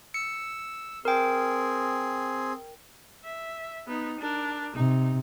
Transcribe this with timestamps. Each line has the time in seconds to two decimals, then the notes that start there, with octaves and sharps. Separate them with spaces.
0.14 E6 C#7
1.05 C4 G#4 A#4 G5
3.24 E5
3.86 B3 D#4
4.20 D4 A#4
4.75 C3 D#4